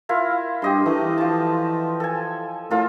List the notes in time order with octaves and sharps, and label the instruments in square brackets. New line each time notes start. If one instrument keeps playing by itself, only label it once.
[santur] E4 F4 A#4
[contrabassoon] G2 [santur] G4 D#5 C6
[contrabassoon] E3 [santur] A3
[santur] F3 A5
A4 G#5
[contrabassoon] A2 [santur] F4 A4 A#4